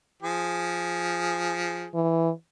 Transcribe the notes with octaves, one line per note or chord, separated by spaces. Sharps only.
F3 G#4
E3